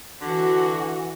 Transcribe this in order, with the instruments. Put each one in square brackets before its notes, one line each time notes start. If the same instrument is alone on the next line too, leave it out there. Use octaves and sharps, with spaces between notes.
[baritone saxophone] D3 [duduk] E3 [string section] F#4